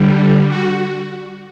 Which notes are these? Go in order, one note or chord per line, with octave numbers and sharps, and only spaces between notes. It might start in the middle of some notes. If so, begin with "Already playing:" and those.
Already playing: D3 G3
F#4